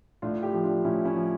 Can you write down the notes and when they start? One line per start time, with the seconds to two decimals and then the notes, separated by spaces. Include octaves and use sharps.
0.22 A2 D4 F4
0.35 F4
0.43 E4 G4
0.53 F3
0.63 D4 F4
0.84 A2 C#4 E4
1.05 C#4 E4
1.15 F3